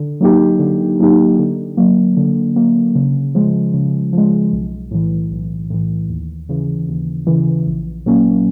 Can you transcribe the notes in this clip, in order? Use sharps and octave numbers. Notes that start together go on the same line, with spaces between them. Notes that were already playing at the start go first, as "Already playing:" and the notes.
Already playing: D3
F#3 A#3 D#4 G4
D3
F#3 A#3 D#4 G4
D3
F#3 A#3
D3
F#3 A#3
C#3
F3 G#3
C#3
F3 G#3
B1
A2 E3
B1
A2 E3
D#2
C#3 E3
D#2
C#3 E3
A#1
A#2 F#3 A#3 C#4